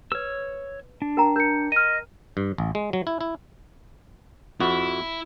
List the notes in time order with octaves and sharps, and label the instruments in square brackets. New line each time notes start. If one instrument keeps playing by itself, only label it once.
[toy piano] B4 [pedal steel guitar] C#5 E6
[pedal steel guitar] D4
[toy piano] A#4 G5 A#5
[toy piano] A#4 [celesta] G6 C#7
[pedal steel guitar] D#5 [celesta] F6 D#7
[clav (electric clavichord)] G2
A1
G#3
F#3
E4
E4
[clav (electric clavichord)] F2 F#4 [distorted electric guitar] E4